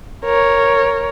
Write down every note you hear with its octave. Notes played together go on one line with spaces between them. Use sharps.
A#4 C#5